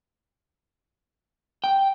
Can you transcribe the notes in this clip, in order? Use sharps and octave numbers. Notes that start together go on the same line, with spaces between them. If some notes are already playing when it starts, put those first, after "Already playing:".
G5